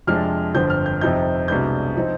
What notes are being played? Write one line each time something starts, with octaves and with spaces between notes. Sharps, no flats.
F2 C3 F3 G#3 D4 F6
G1 F2 D3 F3 C4 G6
F6
G6
F2 C3 F3 C4 D#4 G6
C2 B2 G#3 B3 D4 G6
F3 C4 D#4